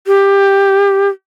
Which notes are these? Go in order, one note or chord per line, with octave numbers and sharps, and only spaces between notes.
G4